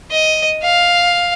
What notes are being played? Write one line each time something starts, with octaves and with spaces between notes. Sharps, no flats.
D#5
F5